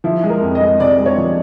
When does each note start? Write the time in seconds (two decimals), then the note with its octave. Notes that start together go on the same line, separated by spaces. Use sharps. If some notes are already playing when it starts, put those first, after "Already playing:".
0.04 F3 E4
0.23 G#3
0.29 A#4
0.41 F2
0.55 D#5
0.61 G#3
0.80 C3 D5
0.99 G#3
1.06 C#5
1.18 F3